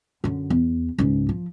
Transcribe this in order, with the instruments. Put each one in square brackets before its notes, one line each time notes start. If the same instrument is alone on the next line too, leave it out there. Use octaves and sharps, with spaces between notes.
[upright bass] F#2 D3
E2
C#2 G#2
F3